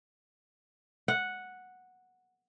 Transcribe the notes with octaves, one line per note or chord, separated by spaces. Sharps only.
F#5